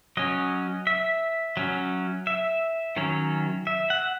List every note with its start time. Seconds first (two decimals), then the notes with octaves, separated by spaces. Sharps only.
0.17 F#3 C#4 D#5
0.87 E5
1.57 F#3 C#4
2.27 E5
2.96 D#3 F#3 C#4
3.67 E5
3.90 F#5